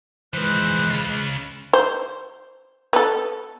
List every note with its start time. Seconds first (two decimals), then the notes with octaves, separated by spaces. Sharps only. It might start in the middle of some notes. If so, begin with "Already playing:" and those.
0.34 E3 F3 G#3 B4 C5 F#6
0.91 C#3 F4 B5
1.73 C5
2.93 B3 A4